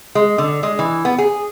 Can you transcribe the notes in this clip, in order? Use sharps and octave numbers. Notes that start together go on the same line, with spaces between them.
G#3
D3
G#3
E3
B3
G#4